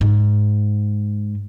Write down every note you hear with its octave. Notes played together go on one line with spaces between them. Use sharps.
G#2